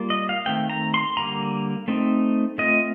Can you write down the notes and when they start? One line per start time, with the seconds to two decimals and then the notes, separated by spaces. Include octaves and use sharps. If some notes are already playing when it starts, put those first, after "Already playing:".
Already playing: G3 A#3 F4
0.10 D#5
0.29 F5
0.46 D#3 A3 C4 G5
0.70 A#5
0.94 C6
1.17 D3 G3 A#3 A#5
1.88 A3 C4 D#4
2.58 A3 C4 F4 D#5